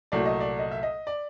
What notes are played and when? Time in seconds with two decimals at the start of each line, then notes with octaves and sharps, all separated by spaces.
0.12 C2 A#2 F#3 A3 D5
0.26 D#5
0.41 D5
0.59 D#5
0.71 E5
0.83 D#5
1.07 D5